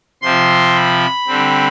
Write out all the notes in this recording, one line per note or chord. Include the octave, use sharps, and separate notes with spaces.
C3 F3 C4 C6
B5
D3 G3 C4